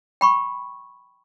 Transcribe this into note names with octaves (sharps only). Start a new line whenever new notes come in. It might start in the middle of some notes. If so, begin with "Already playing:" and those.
G5 B5 C#6